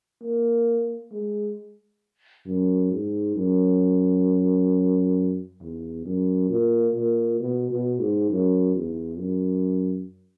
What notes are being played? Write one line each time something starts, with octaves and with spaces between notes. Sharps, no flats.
A#3
G#3
F#2
G#2
F#2
E2
F#2
A#2
A#2
B2
B2
G#2
F#2
E2
F#2